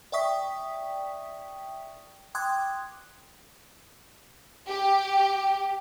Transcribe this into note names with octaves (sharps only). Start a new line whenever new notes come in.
D5 E5 G5 C#6 D#6 B6
G5 C6 D6 D#6 F#6 G#6
G4